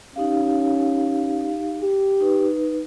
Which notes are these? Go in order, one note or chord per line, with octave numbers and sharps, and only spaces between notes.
C#4 D#4 G4 F5
G4
D#4 B4